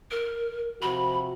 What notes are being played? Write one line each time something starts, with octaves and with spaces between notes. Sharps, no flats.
A#4
C3 F3 F#4 B5